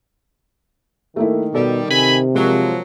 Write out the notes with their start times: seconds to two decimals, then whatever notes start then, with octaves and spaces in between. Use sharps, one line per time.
1.16 D#3 A3 A#3 E4
1.55 B2 G3 A4 D5
1.90 C3 G#5 B5
2.35 F3 F#3 G#3 A#3 A#4